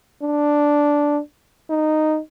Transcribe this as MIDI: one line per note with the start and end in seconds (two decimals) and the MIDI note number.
0.22 1.20 62
1.70 2.19 63